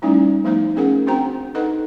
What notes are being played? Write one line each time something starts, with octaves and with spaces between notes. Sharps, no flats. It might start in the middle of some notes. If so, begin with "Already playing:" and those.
G3 A3 C#4 D#4 E4
F3 A3 B3 D#4 C5
B3 C#4 G#4 A#4 F#5
C4 D4 F#4 C5 G5 A#5
D#4 A4 B4 D#5 F#5